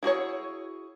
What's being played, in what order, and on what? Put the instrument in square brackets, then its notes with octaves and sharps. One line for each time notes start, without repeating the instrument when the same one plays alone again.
[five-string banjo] E4 F#4 G#4 C#5